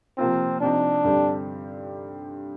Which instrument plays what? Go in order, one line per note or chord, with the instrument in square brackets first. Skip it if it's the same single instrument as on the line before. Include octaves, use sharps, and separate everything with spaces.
[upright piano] C3 F3 A#3 F4 [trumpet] C4
[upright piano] C3 F3 C4 D#4 [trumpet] D4
[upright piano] G2 D3 G3 C4 G4